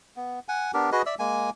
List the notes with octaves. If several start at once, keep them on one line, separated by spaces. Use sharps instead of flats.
B3
F#5 G#5
B3 D4 G4 A#4
F#4 G#4 B4 D#5
D5 E5 E6
G#3 A#3 G#5